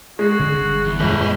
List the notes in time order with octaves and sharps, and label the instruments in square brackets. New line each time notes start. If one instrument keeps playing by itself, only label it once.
[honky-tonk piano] G#3 [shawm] F#4
[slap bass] D3 C#4
G1
[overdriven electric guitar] E2
[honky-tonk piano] G1 [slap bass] F#2 A#2 G#3 [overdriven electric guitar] G#4 B4
[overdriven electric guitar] G#4 D#5